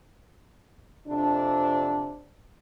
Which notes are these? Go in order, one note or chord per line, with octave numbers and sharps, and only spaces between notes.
F2 C3 D4